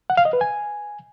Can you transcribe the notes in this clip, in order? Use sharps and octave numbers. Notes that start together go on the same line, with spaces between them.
F#5
F5
D#5
B4
G#5